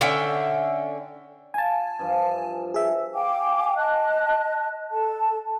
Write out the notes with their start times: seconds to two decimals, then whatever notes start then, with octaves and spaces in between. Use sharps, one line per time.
0.01 D3 C#4 E5 G5
1.54 F5 G#5 A5
1.99 G2 F3 E5
2.74 G#4 E5
3.14 F5 G5 G#5 D6
3.76 D#5 A5 F#6
4.91 A4 A5